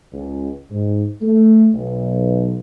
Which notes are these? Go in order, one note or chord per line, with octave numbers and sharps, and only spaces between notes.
C#2
G#2
A3
B1